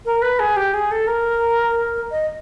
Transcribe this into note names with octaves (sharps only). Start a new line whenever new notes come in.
A#4
B4
G#4
G4
G#4
A4
A#4
D#5